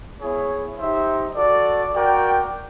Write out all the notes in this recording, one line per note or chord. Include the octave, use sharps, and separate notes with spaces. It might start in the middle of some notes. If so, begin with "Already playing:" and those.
B3 E4 G#4 C#5
D#4 G4 C5 E5
F#4 A4 D5
F#4 A#4 D5 G5